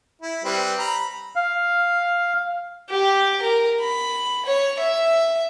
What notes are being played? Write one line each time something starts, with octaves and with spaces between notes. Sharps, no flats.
E4
G3 C4 B4
A#5 B5
F5
G4
A#4
B5
C#5
E5